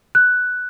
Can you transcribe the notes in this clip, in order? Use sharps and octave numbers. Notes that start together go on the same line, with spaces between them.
F#6